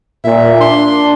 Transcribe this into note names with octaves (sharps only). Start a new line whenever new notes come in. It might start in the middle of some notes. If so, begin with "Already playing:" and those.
A#2 E5
D4 C6